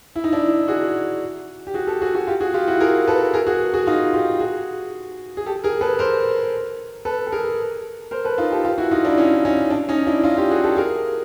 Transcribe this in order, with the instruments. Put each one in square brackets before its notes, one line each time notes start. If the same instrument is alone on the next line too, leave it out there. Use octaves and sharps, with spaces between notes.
[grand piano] E4
D#4
D4 E4
F#4 G#4
G4
F#4 G#4
G4 A4
F#4 G#4
F#4 G#4
F4 G4
F#4 G#4
F4 G4
E4 F#4
G#4 A#4
A4 B4
G#4 A#4
F#4 G#4
F#4 G#4
D#4 F4
F4 G4
F#4 G#4
G#4
G4 A4
G#4 A#4
A4 B4
A#4 C5
A4 B4
A4
G#4 A#4
A#4 C5
A4 B4
D#4 F4
G4 A4
F4 G4
E4 F#4
D#4 F4
D4 E4
C#4 D#4
C#4 D#4
D4
C#4 D#4
D4 E4
D#4 F4
F4 G4
F#4 G#4
G4 A4
G#4 A#4